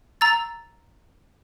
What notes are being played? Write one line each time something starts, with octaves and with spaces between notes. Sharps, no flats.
A#5 E6 A6